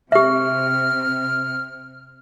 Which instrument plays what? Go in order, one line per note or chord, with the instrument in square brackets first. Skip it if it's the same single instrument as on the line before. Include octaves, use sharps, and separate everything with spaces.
[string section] C3 [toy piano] G4 E5 [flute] F6